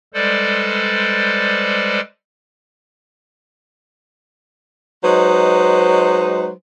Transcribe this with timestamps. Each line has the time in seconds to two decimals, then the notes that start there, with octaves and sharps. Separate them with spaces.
0.14 G3 G#3 A4 B4 C5 D5
5.03 F#3 G#3 D#4 B4 C5